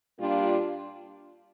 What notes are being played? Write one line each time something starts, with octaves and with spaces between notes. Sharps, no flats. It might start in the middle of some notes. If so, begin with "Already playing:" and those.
A#2 G3 A#3 D4 F4